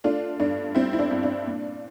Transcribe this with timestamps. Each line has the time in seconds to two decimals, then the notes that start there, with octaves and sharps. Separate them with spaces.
0.04 A3 D4 F4
0.40 G2 D4
0.75 G3 C4 E4
0.93 E4
0.99 D4
1.11 G2
1.23 D4
1.46 A#2